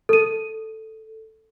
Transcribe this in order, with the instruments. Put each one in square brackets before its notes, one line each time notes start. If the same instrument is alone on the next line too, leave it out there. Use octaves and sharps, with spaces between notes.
[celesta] A4 D#7